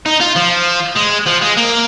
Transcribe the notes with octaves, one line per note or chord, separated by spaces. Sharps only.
D#4
F4
F3
G#3
F3
G#3
A#3